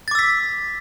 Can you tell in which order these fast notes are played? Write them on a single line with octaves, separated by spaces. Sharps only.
A6 D6 E6 B6